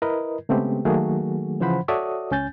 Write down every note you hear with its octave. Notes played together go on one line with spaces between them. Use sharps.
E4 A#4 B4 D#5
C#3 G#3 A3 B3 C4 G4
D#3 F#3 A3 A#3 F#4 G#4
C#3 E3 F3 C5 F#5 B5
F#4 A4 C#5 D5 E5 D#6
C#2 C#4 G#5 G6 A6